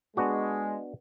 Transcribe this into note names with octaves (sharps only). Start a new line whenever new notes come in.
G#3 B3 D4 F#4